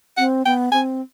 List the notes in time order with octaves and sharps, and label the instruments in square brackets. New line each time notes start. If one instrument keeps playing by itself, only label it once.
[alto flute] C4 [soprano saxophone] F#5
[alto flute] B3 [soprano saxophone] G5
[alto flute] C4 [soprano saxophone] G#5